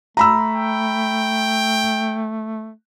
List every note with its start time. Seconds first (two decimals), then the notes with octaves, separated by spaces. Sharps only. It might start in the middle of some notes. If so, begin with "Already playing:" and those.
0.17 A3 A#5 B5 E6
0.55 G5